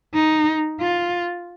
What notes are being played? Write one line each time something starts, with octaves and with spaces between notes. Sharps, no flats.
D#4
F4